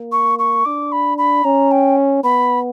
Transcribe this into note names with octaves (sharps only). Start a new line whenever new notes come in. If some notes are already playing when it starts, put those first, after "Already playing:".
Already playing: A#3
C#6
C#6
D4 D6
B5
B5
C#4 A#5
G5
B3 B5